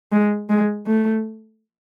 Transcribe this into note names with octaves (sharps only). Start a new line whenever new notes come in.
G#3
G#3
A3